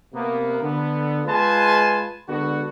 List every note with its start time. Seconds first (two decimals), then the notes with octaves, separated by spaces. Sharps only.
0.13 C3 A#3 B3
0.60 D3 B3
1.25 G#3 F4 B4 G#5 A5 C6
2.28 D3 G#3 B3 F#4